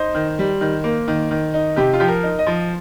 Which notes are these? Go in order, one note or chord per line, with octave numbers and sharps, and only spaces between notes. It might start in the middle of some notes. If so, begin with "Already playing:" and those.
Already playing: D#4 C5
D#3
G3
D#3
A#3
D#3
D#3
D#4
C3 G4
F4
F3 G4
A#4
D#4
D#5
F3